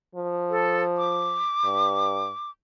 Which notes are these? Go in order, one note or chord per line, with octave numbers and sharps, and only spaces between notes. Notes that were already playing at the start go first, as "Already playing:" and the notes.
F3
A4
D6
G2